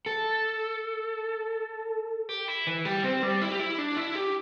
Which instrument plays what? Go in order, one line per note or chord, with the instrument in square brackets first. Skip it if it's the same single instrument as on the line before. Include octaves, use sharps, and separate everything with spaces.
[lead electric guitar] A4
G4
E4
E3
G3
C4
G3
E4
G4
E4
D4
E4
G4